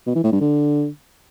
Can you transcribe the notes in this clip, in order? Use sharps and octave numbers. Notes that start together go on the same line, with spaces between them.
B2
E3
A2
G2
D3